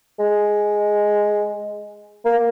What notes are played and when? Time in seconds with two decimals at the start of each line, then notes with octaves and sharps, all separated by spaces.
0.19 G#3
2.25 A#3